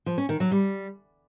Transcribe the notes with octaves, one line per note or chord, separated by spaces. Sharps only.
F3
C#4
D#3
F#3
G3